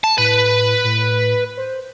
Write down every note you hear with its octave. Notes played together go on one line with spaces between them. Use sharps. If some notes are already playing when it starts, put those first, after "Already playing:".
A5
A2 B4
A2
C5